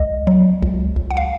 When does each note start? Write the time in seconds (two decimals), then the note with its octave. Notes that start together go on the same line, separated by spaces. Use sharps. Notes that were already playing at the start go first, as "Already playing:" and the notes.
Already playing: C#2 D#5
0.27 F#3
0.62 C#2
0.96 C#2
1.11 F#5
1.17 F5